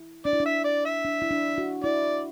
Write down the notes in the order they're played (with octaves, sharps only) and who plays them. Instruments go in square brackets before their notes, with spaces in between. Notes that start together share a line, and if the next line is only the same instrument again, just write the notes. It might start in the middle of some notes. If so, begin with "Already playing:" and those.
Already playing: [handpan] E4
[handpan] D4 [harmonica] D5
[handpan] E4
D4
[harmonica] E5
D5
E5
[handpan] D4
E4
D4
F#4
[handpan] E4 [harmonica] D5